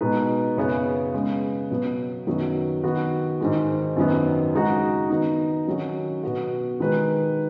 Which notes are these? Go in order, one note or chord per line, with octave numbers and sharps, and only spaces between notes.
B2 G#3 D#4 B4
F#2 C#3 B3 G#4 C#5
C#3 G#3 B3
B2 F#3 B3
F#2 D#3 F#3 B3 F#4
D#3 B3 F#4 B4
G#2 D#3 G#3
F#2 D#3 F#3 B3
C#3 G#3 D#4 F#4
D#3 B3 D#4
D#3 F#3 C#4 F#4
B2 B3 F#4
D#3 G#3 D#4 B4